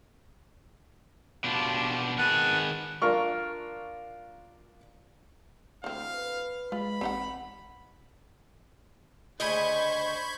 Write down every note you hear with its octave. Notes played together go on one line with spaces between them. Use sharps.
B2 D4 F4 G4
D#3 G#4 B4 F#5 A5
D4 F4 A#4 C#6
D2 E3 C4 F5
B4
G#3 F4 B5
A1 C4 D#4 F#5
D2 C#3 C5 D#5 B5 C#6 G6 G#6